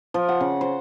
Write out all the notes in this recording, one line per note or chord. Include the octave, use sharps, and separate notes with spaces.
F3
F#5
C#3
C5